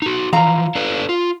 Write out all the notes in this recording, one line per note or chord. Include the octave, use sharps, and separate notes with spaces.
D#4 F#4
E3 F3 F5 A#5
D4 A4 B4
F4